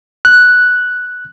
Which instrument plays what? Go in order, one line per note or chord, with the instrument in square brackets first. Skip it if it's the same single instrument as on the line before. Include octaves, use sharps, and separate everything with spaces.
[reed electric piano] F#6